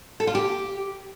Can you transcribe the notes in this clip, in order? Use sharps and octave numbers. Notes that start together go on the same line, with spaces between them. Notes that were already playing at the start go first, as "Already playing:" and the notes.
A4
F4
G4